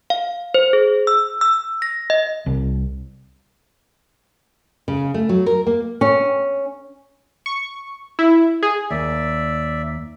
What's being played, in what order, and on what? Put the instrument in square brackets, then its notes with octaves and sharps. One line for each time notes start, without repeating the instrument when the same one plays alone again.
[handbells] F5
C5
G#4
E6
E6
A#6
D#5
[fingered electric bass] C2
[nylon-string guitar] C#3
A3
F#3
A#4
A#3
C#4
[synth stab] C#6
E4
G#4
[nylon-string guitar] D#2 [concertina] D5 E5